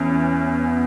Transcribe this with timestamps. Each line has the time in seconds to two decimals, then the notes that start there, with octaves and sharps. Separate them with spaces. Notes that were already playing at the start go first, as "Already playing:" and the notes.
Already playing: E2 C#4
0.64 B3